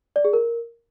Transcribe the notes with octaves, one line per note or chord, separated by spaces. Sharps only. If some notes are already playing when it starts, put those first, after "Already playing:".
D5
G#4
A#4